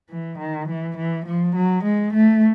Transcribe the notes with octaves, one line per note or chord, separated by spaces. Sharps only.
E3
D#3
E3
E3
F3
F#3
G#3
A3